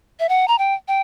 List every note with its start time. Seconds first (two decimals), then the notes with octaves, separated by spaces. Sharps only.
0.20 E5
0.29 F#5
0.48 A#5
0.59 G5
0.88 G5